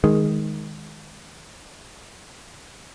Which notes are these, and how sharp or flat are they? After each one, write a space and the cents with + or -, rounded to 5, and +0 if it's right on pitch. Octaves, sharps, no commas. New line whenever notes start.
D#3 +0 G#3 +0